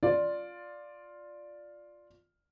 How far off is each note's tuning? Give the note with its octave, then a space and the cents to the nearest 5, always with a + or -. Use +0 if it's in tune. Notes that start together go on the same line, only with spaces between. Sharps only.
F4 +5 D5 +0